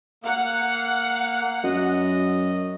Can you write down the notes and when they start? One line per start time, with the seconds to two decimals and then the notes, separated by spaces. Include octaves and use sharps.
0.24 A#3 F5 F#5
1.64 F#2 D#5